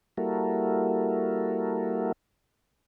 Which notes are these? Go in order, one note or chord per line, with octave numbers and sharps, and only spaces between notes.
G3 A#3 E4 F#4 A4 A#4